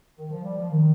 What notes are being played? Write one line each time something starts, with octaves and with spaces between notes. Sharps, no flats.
D#3
F3
G3
F3
D#3